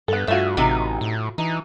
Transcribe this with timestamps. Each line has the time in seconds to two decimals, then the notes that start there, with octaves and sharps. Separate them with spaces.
0.08 G2 B3 A4
0.28 G2 A3 F4 F#4 E5 G#5
0.57 A1 C3 B3 D#4
1.01 A2
1.38 E3 D#4